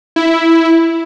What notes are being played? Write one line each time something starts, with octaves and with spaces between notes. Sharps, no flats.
E4